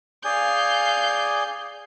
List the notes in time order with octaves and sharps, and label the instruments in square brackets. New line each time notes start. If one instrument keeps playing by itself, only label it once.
[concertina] G#4 D5 G#5 [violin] F5 G6